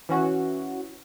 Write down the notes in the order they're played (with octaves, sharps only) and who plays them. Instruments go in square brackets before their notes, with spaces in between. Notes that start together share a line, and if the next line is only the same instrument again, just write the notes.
[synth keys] E3 C#4 F#4